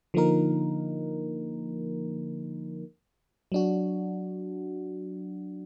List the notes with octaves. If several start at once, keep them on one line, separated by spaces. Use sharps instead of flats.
D3 F3 A#3 D#4 A#4
F#3 D4 F#4